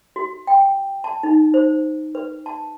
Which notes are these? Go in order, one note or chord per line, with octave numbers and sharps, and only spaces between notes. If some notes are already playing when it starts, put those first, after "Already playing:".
F#4
G5
A5
D#4
C5
B4
A5